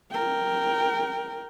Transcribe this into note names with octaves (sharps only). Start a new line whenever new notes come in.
A#4 G5